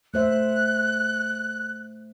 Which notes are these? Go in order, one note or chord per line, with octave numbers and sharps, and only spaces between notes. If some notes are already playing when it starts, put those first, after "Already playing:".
A3 C5 E5 F#6